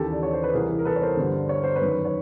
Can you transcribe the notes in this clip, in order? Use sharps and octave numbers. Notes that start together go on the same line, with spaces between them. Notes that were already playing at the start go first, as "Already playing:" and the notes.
Already playing: D#2 C#3 E3 G4 A4
D5
C#5
C5
B4
C2 C3 E3 G#4 A#4
A#4
A4 B4
C#5
A#4 C5
G2 D3
C#5
C5
B4 C#5
F#2 D#3
C#5